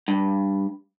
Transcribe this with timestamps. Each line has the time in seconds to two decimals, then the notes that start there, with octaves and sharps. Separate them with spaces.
0.08 G2